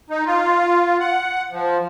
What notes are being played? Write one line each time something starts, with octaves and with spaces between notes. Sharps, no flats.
D#4
F4
F#5
F3